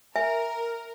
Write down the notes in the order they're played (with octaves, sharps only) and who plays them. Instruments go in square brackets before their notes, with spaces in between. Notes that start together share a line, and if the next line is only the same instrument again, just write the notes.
[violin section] A#4 [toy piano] E5 G#5